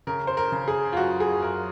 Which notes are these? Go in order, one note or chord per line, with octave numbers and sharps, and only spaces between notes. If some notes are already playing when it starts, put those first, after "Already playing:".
C#3 A#4
C5
A#4
C#3
G#4
F4
F#2 F#4
G#4
F#2 A#4